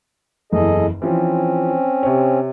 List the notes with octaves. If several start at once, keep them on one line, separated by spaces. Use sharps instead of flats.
F#1 E2 G#4 A4 D#5
E3 F3 C4 C#4
C3 C#5